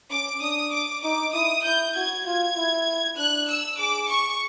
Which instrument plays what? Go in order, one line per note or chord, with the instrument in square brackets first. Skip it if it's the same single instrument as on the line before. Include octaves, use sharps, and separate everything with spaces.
[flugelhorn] C#4 [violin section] D6
[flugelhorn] D4 [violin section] D#6
[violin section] D6
[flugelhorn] D#4 [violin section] D6
[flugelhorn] E4 [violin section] D#6
[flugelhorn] E4 [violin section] G6
[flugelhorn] F#4 [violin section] G#6
[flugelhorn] F4 [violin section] G#6
[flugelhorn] E4
[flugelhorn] D4 [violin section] F#6
[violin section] E6
[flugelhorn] G#4 [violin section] D6
[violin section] C#6